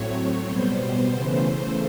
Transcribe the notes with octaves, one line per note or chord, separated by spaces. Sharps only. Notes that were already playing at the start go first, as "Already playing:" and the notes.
Already playing: A2 F#3 A3 C4 C#5
B2 G3 B3 C5
C5
C#3 E3 A3